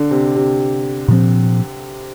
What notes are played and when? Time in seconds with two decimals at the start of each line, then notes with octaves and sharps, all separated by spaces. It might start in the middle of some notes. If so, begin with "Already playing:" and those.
Already playing: D3
0.11 C3
0.36 C3
1.08 A#2 F3 C4